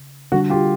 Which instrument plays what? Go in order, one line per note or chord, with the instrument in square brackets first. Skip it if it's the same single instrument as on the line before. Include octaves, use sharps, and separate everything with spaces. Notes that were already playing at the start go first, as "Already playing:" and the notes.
Already playing: [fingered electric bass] C#3
[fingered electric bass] D3 G3 B3 D4 [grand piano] F#4
[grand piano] F4 G4